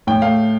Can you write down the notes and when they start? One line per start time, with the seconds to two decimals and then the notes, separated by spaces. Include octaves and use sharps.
0.07 A2 G5
0.22 A3 F5